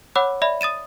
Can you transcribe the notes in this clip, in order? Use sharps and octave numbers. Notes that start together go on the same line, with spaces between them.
C#5 F#5 B5 D6 E6 F#6
D5 E5 B5
D#6 A6 D#7 E7